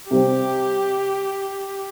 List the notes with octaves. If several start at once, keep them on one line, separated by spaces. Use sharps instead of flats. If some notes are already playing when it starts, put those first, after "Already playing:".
C3 G3 C4 G4